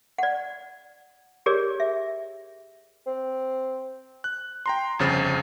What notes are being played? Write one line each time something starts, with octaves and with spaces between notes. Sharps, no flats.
D5 F#5
G4 G#4 A#4 C#5 D5
E5
C4
F#6
G5 A#5 C6
G1 F2 C#3 C5 A6